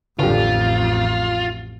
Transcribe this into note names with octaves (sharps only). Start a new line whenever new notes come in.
A1 F2 D3 F4 G4